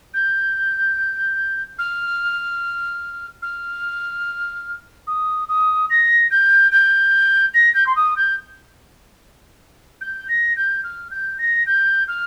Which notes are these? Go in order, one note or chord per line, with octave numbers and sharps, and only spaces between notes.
G6
F6
F6
D#6
D#6
A#6
G6
G6
A#6
G6
C6
D#6
G6
G6
A#6
G6
F6
G6
A#6
G6
F6